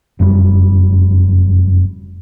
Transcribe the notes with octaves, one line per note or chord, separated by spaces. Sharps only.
F1 F#2 G3